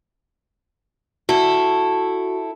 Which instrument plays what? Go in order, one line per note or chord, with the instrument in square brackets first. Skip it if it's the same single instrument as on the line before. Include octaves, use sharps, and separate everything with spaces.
[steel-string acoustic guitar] E4 A4 [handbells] F#4